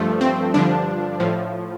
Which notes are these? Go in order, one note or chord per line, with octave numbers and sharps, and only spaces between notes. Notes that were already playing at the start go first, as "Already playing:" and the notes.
Already playing: G2 F3 A3
C4
G2 D3 F3 D4
A2 F3